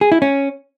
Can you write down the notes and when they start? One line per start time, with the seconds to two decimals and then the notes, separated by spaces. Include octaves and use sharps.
0.01 G#4
0.12 E4
0.22 C#4